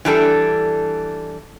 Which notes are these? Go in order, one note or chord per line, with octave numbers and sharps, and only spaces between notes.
E3 G3 D4 A4